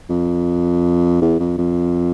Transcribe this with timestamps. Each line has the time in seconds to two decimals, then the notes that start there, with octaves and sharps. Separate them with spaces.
0.10 F2
1.22 E2
1.40 F2
1.58 F2